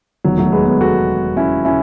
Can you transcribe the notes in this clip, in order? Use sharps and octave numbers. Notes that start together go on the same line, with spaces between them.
E1 D#2 D#3 F#3
F#3 A3
G#3 B3
G#3 B3
F#4 A4
C#4 E4
C#4 E4